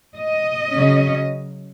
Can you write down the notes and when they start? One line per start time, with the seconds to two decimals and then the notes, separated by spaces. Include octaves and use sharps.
0.13 D#5
0.71 C#3 F#3 C#4